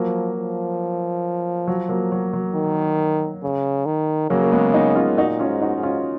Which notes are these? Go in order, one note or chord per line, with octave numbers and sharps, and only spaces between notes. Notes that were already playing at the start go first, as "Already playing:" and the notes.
Already playing: F3 F#3 A#3
F3
F#3
F#3 A#3
F#3
F#3
D#3
C#3
D#3
C#3 F#3 A#3
A#3
G#3 B3
B3 D#4
C#4 F4
A#2 D#4 F#4
C#4 F4
G#2
D#4 F#4
G#2
C#4 F4